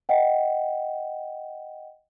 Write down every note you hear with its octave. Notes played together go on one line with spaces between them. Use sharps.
D#5 F#5 G5